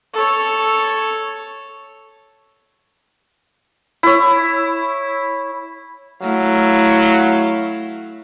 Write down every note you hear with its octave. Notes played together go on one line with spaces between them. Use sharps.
A4 C#5
E4 C#5
F#3 A3 E4 F5